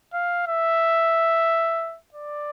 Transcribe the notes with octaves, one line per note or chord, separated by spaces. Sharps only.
F5
E5
D5